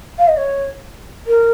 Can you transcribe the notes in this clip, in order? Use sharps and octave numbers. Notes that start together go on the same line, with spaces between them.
F5
D#5
C#5
A#4